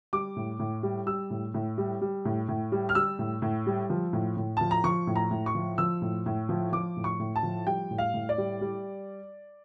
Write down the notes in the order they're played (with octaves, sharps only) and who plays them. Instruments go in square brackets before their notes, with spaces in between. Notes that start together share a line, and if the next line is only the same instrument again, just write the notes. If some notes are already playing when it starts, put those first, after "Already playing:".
[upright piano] G3 D6
A2
A2
G3
G3 E6
A2
A2
G3
G3
A2
A2
G3
F6
G3 E6
A2
A2
G3
F3
A2
A2
F3 A5
A#5
F3 C#6
A2
A#5
A2
C#6
F3
F3 E6
A2
A2
F3
F3 D6
A2
C#6
A2
A5
F3
G3 G5
A2
F5
A2
D5
G3
G3